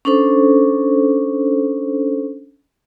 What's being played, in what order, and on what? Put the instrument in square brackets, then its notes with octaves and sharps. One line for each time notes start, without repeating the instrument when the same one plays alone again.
[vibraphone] C#4 D4 A4 C5